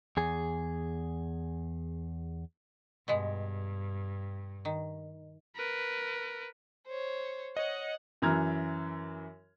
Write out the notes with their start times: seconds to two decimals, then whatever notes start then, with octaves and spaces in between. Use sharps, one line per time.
0.17 E2 G#4
3.08 G2 B2 G#3
4.65 D#3
5.56 A#4 B4
6.87 C5 C#5
7.57 C#5 D#5 F#5
8.22 F#2 E3 A#5 F6 G#6